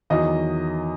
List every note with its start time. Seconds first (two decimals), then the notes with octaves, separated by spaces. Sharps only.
0.10 E2 D#3 F#3 D#5